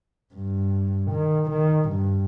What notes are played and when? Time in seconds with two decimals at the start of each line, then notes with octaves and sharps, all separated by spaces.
0.34 G2
1.11 D#3
1.50 D#3
1.89 G2